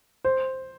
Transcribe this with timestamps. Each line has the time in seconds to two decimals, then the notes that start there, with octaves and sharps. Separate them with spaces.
0.25 C5